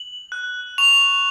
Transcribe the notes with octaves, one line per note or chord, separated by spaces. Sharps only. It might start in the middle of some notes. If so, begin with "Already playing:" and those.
Already playing: F#7
F#6
C#6 F7